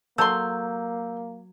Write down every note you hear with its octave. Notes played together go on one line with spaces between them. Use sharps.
F#3 A#3 A4 C6 E6 G6